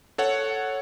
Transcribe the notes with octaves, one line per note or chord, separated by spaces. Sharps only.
A4 C#5 F#5